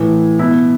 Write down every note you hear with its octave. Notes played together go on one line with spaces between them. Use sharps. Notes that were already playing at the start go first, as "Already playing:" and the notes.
Already playing: A2 E3
B2 E4